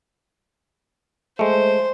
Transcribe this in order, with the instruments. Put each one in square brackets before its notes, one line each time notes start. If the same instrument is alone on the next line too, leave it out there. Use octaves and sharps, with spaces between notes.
[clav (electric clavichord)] G#3 A3 [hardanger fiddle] C5